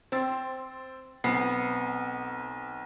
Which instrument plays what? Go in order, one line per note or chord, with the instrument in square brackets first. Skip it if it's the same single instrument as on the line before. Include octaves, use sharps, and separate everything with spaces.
[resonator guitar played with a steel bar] C4 [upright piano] C5 E6 A6
[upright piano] B1 C4 C7 [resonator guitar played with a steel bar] B3